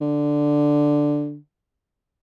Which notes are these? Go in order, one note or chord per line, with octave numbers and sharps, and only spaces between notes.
D3